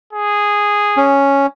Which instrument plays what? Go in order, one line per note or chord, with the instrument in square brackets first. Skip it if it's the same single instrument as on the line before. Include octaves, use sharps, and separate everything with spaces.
[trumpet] G#4
[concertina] C#4